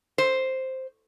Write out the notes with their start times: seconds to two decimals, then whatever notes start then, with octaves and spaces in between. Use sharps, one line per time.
0.18 C5